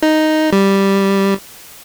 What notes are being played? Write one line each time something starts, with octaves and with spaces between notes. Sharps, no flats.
D#4
G3